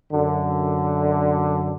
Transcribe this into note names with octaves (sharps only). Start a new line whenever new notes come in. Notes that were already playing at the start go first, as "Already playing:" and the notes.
F#2 D3